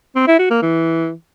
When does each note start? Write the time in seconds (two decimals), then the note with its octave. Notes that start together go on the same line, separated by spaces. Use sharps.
0.16 C4
0.27 E4
0.39 F#4
0.51 A#3
0.62 E3